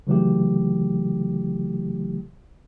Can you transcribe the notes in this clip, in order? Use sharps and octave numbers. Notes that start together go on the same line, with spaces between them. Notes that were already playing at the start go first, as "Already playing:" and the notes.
C#3 E3 F#3 A3 G4